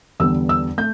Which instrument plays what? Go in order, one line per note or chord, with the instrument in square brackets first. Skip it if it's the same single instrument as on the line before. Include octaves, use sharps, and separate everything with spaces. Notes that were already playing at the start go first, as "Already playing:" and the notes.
[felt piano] E2 D3 G3 B3 E6
E6
A3 G6